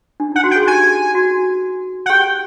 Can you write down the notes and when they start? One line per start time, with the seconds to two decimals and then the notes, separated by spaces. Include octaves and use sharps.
0.20 D4
0.32 D#4 F#5
0.44 F#4
0.51 G5
0.56 G#4
0.67 G4 G#5
1.15 F#4
2.06 F#5
2.10 G4 G5